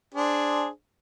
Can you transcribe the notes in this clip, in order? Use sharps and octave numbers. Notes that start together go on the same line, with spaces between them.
D4 G#4 C5